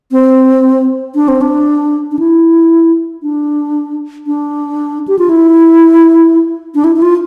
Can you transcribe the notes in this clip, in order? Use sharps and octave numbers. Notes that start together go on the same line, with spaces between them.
C4
D4
C4
D4
D4
E4
D4
D4
G4
F4
E4
D4
E4
E4
F4